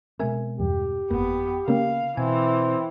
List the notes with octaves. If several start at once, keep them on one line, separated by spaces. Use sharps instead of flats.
B2 G#3 C4 A#4 E5 G#5
E2 G2 G4
G1 F2 A#3 B3
C#3 A#3 C#4 A#4 F5
B2 E3 C4 G#5